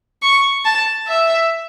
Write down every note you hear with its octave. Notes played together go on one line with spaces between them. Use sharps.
C#6
A5
E5